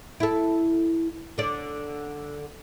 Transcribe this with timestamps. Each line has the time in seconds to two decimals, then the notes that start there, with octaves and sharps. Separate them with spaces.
0.20 E4 A4
1.38 D3 D5